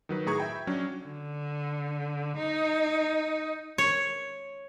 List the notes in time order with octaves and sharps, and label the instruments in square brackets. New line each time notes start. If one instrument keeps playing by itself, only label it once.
[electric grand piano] D#3 F#3 B4
A2 G#4 A#5 C#6 G#6
E5 G5 B5
F#3 C#4 D4
[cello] D3
D#4
[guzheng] C#5